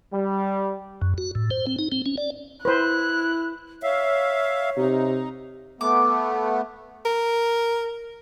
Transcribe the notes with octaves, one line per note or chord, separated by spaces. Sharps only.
G3
F#2
F#4
A2
C5
C4
D#4
C4
C#4
D5
E4 B4 C5 F#6
C#5 E5 F5
C3 D#4
A3 B3 D6
A#4